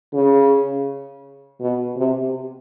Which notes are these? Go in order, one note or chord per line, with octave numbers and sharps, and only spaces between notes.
C#3
B2
C3